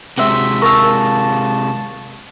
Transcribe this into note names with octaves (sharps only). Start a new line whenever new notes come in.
C3 G#3 F#4 C5 E5
A#4 F5 A5 C#6 E6